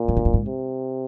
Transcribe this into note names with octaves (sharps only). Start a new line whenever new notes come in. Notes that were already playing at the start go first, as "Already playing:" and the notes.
Already playing: A#2
A2
G#2
G2
G#2
C3